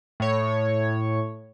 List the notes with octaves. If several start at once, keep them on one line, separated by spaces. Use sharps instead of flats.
A2 C#5